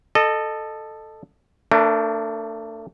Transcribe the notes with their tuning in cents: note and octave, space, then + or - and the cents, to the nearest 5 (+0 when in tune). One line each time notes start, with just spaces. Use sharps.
A4 +0 D#5 -25
A3 +35 D4 +0 A#4 +40